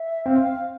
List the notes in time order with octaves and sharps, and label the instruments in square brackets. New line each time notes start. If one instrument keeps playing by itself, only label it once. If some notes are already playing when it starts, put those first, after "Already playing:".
Already playing: [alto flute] E5
[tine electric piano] C4 [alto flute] F5